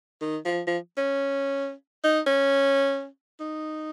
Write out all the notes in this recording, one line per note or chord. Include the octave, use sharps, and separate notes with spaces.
D#3
F3
F3
C#4
D#4
C#4
D#4